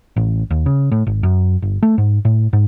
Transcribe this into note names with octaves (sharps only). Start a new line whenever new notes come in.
A1
D#2
C#3
A2
G#1
F#2
G1
A3
G#2
A2
G#2